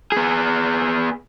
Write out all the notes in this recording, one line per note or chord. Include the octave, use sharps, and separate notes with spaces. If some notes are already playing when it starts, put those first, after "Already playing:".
B3 G#4